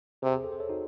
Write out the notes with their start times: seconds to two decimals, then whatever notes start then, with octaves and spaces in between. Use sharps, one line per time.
0.22 C3 G#4 C5
0.36 G#4
0.44 A4
0.52 C5
0.60 A4 C#5
0.69 D#4 F#4